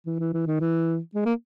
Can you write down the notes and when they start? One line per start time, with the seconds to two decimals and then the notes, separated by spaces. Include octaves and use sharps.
0.06 E3
0.19 E3
0.33 E3
0.47 D#3
0.60 E3
1.15 G#3
1.25 A#3